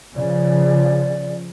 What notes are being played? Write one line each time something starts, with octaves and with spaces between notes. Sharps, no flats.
C#3 F3 D5